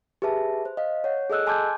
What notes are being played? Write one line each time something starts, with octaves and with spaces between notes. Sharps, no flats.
G4 G#4 B4 E5 A5
C5
D#5 F5
C#5 F#5
G#4 A4 D#5 E6 F#6
G#5 A5 C6 D6 G6 G#6